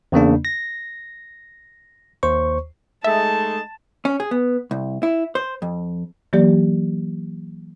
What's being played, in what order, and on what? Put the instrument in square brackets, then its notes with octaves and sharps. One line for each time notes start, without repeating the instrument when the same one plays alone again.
[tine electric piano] E2 C#3 A#3 D4
A#6
D#2 C5 C#6
[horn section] G#3 A3 D#4 [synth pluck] E5 [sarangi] A5
[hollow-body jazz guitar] C#4
G#4
B3
C2
E4
C5
F2
[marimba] E3 F#3 A#3 G4 D5